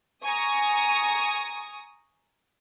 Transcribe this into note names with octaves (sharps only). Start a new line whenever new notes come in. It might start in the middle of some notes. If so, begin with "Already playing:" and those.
G#5 A#5 C#6 D#6